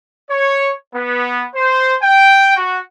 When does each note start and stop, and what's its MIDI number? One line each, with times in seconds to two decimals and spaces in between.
0.30 0.70 73
0.93 1.44 59
1.55 1.94 72
2.02 2.53 79
2.56 2.77 66